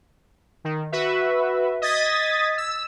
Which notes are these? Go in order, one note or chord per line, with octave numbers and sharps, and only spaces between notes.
D#3
F#4 B4 E5
D#5 D#6 G#6 A6 B6
E6